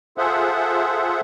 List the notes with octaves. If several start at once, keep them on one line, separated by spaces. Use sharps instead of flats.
F4 G#4 A4 C5 E5 F#5